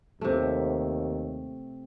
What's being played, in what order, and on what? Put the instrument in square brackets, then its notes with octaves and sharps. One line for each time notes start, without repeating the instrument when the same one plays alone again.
[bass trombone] D#2 [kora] C3 A3